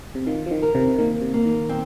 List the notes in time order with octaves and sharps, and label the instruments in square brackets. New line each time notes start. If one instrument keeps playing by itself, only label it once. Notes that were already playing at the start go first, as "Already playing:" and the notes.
[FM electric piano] C3
[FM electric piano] D#3 [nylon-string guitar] F4
[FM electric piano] F3
D#3
[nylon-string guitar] A#4
[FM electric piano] C3
[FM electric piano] D#3 [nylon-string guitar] A#3
[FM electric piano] C3
[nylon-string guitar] A#3
[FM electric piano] D#3
[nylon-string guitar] C4